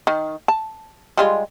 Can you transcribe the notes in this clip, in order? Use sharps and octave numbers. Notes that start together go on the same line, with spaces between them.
D#3
A5
G3 G#3 F4